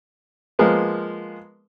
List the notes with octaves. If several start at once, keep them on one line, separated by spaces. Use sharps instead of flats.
F3 G#3 A#3 B3